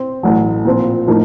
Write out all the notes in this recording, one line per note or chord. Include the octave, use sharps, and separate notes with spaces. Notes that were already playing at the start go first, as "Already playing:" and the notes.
Already playing: C4
A1 A2 F#3
A#2 F3 C4
A2 F3 A#3 D#4